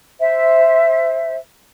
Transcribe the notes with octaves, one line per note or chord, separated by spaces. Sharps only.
C5 E5